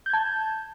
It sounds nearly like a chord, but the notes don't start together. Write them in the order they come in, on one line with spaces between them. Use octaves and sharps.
G6 G#6 A5